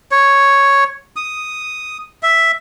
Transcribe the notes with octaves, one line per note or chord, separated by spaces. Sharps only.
C#5
D#6
E5